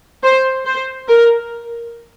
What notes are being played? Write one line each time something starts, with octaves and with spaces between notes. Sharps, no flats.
C5
C5
A#4